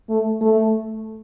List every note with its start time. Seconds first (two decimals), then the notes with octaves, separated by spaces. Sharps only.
0.09 A3
0.41 A3